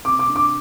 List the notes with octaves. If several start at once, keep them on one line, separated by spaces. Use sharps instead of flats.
C3 D6
D6
D4
D6